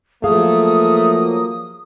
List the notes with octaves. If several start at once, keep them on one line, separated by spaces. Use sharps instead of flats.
F3 F#3 A3 A#3 G#4 F5 D#6